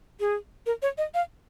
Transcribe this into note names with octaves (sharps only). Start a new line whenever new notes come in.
G#4
A#4
C#5
D#5
F5